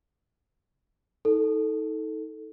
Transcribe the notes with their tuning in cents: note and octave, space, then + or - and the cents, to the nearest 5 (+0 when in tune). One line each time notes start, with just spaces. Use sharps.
D#4 +35 A4 +0